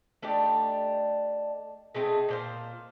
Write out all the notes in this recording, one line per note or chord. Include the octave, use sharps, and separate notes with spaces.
A3 D4 D#4 G4
G#3 A3 C4 D#4
A#2 C5 F5